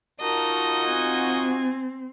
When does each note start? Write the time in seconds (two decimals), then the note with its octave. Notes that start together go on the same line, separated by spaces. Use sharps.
0.21 D#4 F4 F#4 A#4 D#5 A5
0.87 C4 G#5